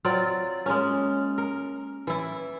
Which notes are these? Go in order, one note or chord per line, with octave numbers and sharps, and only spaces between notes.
F#3 C4 F4 D5
G#3 A#3 C#4
A#4
E3 E4